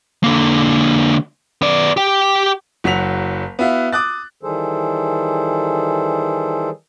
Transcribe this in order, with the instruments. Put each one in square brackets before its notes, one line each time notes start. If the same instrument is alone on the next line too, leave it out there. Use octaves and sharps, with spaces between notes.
[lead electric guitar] D3 A#3
B3 D5
G4 G5
[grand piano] F#1 F#3 F#5 B6 F7
B3 E4 F#4 E5 F5
D6 D#6 F#6 A6
[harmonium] D#3 E3 G3 G#4 A4 C5